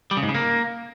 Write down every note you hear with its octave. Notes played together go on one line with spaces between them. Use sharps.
G3
C#3
G#2
C#3
A#3